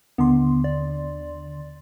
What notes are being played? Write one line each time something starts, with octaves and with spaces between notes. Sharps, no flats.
D#2 D3 B3 C6
D5